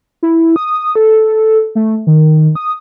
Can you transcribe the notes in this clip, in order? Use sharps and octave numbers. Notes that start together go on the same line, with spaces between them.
E4
D#6
A4
A3
D#3
D#6